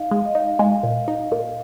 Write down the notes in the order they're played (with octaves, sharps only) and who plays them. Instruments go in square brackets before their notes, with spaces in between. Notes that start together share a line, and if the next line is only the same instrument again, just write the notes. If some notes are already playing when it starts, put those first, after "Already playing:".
Already playing: [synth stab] D#4 [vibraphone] F5
[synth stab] G#3
[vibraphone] D#5
[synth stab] D#4 [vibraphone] F5
[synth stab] G#3
A#2
D#4
A#2